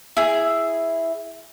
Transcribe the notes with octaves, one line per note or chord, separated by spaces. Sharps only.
E4 G#4